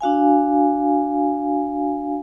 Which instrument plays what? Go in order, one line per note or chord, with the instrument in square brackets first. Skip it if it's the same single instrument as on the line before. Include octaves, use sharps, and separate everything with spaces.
[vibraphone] D4 F#4 F5 G#5